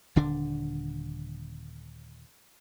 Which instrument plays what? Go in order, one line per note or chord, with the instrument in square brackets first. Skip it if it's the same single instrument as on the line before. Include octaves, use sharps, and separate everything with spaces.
[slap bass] D#1 D3 D4